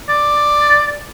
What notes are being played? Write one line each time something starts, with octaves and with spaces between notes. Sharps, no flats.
D5